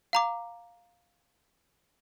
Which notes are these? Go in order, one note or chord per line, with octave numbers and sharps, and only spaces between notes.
F5 A#5 D6